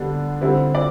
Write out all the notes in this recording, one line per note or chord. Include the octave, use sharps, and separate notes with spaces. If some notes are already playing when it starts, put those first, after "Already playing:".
Already playing: D3 G3 B3 D4
D3 G3 C4 E4
D5